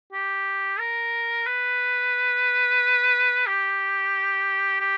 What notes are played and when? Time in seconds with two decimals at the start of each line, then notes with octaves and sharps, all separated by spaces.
0.12 G4
0.79 A#4
1.46 B4
3.46 G4
4.80 G4